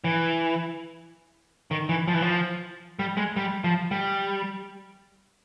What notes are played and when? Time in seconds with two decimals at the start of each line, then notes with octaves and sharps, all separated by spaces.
0.04 E3
1.71 D#3
1.89 E3
2.08 F3
2.14 E3
2.22 F3
2.99 G3
3.17 G#3
3.36 G3
3.64 F3
3.91 G3